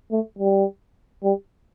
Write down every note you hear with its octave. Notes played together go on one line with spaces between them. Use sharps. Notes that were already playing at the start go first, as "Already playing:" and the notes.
A3
G3
G3